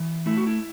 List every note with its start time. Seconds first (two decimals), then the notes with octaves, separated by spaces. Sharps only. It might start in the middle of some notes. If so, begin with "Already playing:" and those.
Already playing: E3
0.26 A3 E4
0.37 F#4
0.47 E4